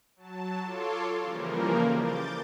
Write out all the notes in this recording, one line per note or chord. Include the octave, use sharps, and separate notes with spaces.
F#3 A5
F4 A4 C#5 C6 D6
C#3 E3 F3 G3 A#3 A#4
D6 G6 A6